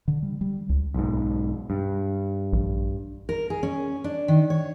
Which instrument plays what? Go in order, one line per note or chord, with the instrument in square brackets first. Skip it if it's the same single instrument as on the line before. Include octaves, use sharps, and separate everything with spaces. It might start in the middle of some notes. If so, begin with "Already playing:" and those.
[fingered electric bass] D3
G3
G3
C#2
[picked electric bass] B1 G#2
G2
[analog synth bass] A#1
[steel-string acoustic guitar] A#4
G#4
C#4
D4
D#3
C#5